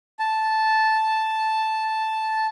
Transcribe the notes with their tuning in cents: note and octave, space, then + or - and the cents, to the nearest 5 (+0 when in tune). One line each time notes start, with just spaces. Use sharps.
A5 -5